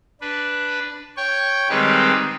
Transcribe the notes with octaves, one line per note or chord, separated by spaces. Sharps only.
D4 B4
C#5 G5 C#6
D#3 G3 G#3 C4 G4 B4